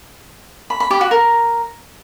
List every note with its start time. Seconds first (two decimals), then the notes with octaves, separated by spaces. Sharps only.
0.70 B5
0.80 B5
0.91 G4
1.01 F#4
1.11 A#4